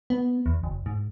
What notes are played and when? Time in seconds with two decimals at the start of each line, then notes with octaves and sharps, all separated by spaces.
0.10 B3
0.46 E2
0.63 F#1
0.86 G#2